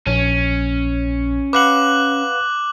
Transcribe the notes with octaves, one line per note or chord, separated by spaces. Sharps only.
A#1 C#4
B4 F5 F#5 D6 F#6 F#7